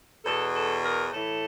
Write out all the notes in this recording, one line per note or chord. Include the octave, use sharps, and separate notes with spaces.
E2 B2 A4
A4
A#4
A2 E3 A4